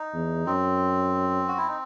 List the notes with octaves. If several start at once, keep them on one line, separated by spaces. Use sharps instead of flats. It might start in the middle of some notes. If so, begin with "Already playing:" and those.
Already playing: D#4
E2
F#2 C4
F#4
E4
D#4